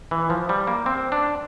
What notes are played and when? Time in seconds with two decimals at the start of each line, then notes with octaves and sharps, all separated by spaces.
0.11 E3
0.30 F3
0.49 G3
0.67 A#3
0.86 C4
1.12 D4